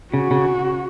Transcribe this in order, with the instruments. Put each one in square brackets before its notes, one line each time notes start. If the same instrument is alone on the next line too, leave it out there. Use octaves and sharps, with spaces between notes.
[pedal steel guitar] C#3 [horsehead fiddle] F#4
[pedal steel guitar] C#3